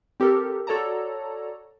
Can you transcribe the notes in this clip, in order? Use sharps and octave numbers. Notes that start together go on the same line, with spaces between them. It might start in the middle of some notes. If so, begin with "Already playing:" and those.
C4 G4 A4 A#4
F#4 A4 C#5 D5 A5 A#5